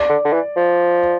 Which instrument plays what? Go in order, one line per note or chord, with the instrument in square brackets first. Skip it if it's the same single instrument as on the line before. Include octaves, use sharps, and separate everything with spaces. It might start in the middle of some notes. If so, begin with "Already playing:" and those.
Already playing: [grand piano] D5
[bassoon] D3
D3
E3
F3